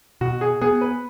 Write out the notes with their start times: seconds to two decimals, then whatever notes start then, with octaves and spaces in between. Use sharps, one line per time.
0.21 B2 F#4
0.41 G#4
0.61 B3 G#4
0.81 B4